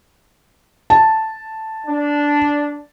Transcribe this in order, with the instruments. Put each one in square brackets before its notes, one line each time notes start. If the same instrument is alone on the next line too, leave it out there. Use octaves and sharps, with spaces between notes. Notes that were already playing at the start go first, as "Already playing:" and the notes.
[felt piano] A5
[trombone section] D4